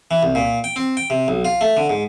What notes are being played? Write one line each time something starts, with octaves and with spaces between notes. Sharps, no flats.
E3
C2
A#2
G5
C4
G5
C3
B1
F4
A3
D3
G#2